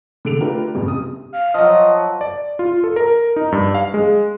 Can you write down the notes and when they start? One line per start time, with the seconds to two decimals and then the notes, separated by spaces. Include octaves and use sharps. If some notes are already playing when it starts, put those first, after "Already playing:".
0.25 D3 A4 D7 F7
0.40 A3 D4 F4 G4 A#4 B4
0.74 G1 C2 F#2 C#3
0.88 C3 D#6
1.33 F5
1.54 F3 F#3 D#5
2.21 D5
2.59 F4
2.84 A4
2.96 A#4
3.36 D#4
3.52 G2
3.75 F5
3.94 G#3